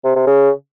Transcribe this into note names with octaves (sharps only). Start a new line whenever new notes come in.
C3
C3
C#3